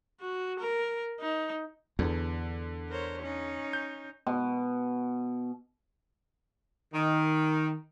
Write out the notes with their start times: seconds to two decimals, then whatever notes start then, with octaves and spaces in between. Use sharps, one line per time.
0.21 F#4
0.59 A#4
1.20 D#4
1.99 E2 D3
2.89 A#4 C5 C#5
3.22 C#4 D#4
3.73 G6
4.27 B2
6.94 D#3